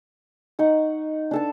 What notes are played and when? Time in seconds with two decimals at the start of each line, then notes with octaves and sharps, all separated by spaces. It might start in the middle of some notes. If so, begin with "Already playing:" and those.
0.59 D#4 F#5 C#6
1.31 D4 A4 A5